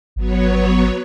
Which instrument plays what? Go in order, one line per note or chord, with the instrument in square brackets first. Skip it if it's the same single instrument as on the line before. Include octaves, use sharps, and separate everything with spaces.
[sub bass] G#1 [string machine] F#3 B3 C#5